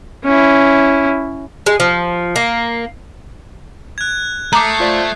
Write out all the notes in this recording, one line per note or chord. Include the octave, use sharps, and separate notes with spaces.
C#4 E4
G#3
F3
A#3
F#6 G#6
A3 A#5 D6 D#6 G6 C7
F4 C5 D5